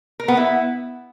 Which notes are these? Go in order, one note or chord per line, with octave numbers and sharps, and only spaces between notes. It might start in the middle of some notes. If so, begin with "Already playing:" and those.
A#4
B3
E4